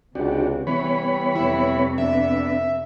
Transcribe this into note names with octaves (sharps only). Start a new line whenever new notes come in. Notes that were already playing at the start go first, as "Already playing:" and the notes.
C#2 C3 D4 F#4 G4
E3 G3 B3 C#5 B5
F2 C3 E4
B3 D4 E5